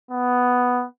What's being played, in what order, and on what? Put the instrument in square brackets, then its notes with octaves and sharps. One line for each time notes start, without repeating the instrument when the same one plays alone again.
[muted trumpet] B3